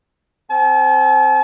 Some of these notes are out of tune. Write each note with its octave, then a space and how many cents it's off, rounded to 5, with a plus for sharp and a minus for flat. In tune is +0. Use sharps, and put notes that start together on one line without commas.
C4 +0 A5 -40